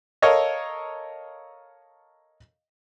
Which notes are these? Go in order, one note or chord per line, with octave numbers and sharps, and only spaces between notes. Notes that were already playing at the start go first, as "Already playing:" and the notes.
A4 A#4 C#5 D#5 F5